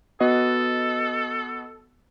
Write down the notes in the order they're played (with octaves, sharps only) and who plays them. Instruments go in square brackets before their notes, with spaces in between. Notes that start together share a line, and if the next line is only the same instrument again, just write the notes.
[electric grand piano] B3 F#4 D#5 [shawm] A4